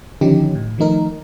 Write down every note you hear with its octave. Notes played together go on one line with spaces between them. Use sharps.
D3 D#3 F3 C#4 D#4 G4
A2
D#3 F3 A3 D#4 A#4